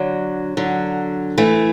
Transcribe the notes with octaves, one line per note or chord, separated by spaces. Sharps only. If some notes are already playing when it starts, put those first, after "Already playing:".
Already playing: D3 F#3
D3 F#3
E3 A3